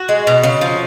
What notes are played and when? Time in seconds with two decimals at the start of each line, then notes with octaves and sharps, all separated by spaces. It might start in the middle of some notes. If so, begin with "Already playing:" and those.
Already playing: F#4
0.09 G#3
0.27 B2
0.43 C#3
0.61 F3